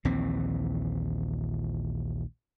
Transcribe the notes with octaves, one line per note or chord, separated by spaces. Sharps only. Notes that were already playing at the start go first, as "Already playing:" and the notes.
A#1 D#2 E3 C4